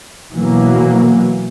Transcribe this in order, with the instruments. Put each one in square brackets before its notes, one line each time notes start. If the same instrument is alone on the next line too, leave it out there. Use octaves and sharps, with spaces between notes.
[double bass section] B2 E3 F#3 A#3